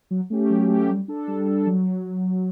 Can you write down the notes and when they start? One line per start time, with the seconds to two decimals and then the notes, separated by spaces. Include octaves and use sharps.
0.11 F#3
0.30 A3 C#4 G4
0.50 F#3
0.70 A3 C#4 G4
0.89 G3
1.08 D4 A4
1.28 G3
1.47 D4 A4
1.67 F#3